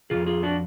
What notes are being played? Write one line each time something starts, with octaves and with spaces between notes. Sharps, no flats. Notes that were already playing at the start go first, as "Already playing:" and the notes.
F2 C#3 F4 G#4
F4 G#4
D4 F#4